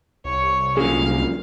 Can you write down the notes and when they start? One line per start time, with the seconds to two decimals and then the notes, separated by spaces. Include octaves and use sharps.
0.25 C2 C#5
0.77 F#2 A#2 D3 G#4 F5